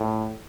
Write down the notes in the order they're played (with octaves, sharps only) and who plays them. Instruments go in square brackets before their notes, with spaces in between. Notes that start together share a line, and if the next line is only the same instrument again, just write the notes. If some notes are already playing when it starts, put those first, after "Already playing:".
Already playing: [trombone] A2